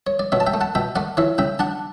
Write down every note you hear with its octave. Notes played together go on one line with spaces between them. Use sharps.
C#5
D5
B2 C#5 E5
A5
E5 G5
A3
F#5 A5
B2 E5 G5
A3 D5 F#5
E3 C#5 E5
C#3 E5 G5
D4 F#5 A5